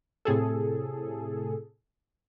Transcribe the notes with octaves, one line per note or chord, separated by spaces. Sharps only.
A2 C3 G#4 A4